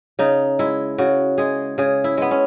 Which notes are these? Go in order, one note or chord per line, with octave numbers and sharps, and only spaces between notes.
C#3 D#4
G#3 E4
C#3 F#4
G#3 G#4
C#3 G#4
E4
G#3 B3
C#4